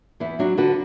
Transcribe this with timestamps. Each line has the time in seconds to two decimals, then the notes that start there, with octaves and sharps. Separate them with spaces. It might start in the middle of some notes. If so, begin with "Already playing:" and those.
0.20 E2 B3 E4
0.39 F#3 D4 F#4
0.57 D3 F#4 B4